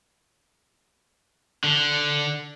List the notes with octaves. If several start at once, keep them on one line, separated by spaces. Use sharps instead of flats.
D3